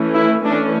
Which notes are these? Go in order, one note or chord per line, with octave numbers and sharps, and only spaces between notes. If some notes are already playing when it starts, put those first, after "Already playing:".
Already playing: E3 A3 C#4
E4
E3 A3 C#4 D4